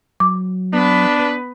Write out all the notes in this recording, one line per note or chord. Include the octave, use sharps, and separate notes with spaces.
F#3 D6
B3 D4 B4